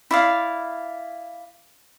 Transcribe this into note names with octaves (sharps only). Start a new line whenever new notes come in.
E4 D5 F5